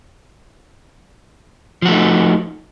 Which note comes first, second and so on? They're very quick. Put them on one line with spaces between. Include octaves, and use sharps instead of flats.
F3 F#4 A3 D#4